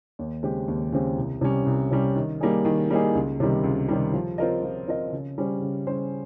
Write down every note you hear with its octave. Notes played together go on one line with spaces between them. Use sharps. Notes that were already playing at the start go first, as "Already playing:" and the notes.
D#2
C#3 G#3 C4 G4
D#2
C#3 G#3 C4 G4
C2
C3 G3 C#4
C2
C3 G3 C#4
D#3
G3 A#3 D#4 G#4
D#3
G3 A#3 D#4 G#4
C#2
C3 D#3 G3
C#2
C3 D#3 G3
F3
C4 F4 A#4 D#5
F3
C4 F4 A#4 D#5
C#3
G3 C#4 G#4 C5
C#3
G3 C#4 G#4 C5